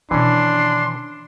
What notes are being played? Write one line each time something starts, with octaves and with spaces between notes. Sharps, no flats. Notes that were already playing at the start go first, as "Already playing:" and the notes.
B2 D#3 E3 C#4 D4 C6